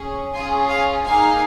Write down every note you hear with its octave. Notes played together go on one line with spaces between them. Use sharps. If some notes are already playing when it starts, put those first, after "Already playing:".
Already playing: C#4 G#4
C#4 F4 G#4 G#5 C6
F5 G#5
A#3 D#4 G#4 F5 G#5